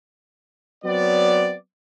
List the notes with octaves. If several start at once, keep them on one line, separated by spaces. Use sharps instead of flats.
F#3 B3 C4 D5